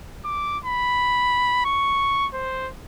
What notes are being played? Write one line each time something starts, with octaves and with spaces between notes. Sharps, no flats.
D6
B5
C#6
C5